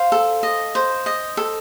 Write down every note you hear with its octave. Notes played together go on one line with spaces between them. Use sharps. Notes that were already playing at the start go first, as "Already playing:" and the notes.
Already playing: C5 F5
A4
D#5
C5
D#5
A4